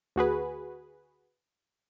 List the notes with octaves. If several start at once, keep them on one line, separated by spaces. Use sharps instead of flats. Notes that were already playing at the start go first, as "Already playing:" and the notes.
D2 F#4 G#4 B4